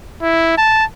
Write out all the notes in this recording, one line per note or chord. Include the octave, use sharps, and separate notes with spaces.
E4
A5